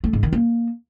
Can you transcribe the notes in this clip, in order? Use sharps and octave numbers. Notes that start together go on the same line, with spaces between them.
A3
G#2
D#3
A#3